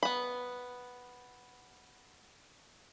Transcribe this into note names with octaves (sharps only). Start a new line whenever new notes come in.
B3 B5